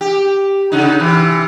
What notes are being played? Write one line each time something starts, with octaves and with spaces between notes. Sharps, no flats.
G4
C#3 D#4
C3 E3